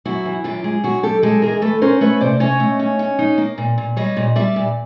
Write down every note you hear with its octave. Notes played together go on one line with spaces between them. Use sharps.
F#2 E4 F#4
E3
F#2 F4 G4
G#3
F#2 F#4 G#4
F#2 G4 A4
G#3 G4 A4
E3 G#4 A#4
A3 A4 B4
C#4 A#4 C5
A3 B4 C#5
C3 C5 D5
C#4 C#5 D#5
A3
C#4
C#4
D#4
A#3
A#2
A#2
G3 C#5 D#5
A#2
G3 D5 E5
A#2